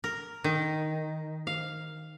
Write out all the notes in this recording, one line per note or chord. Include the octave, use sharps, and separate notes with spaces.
A#4
D#3
F5